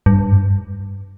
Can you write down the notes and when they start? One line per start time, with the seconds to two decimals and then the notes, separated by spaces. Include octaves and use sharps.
0.06 G2